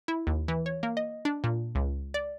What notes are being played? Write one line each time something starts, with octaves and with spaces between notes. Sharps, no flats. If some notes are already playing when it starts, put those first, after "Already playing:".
E4
D#2
E3
C#5
A#3
D#5
D4
A#2
C#2
D5